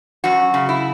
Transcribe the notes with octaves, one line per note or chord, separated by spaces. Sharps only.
F#2 F#4
C#3
E4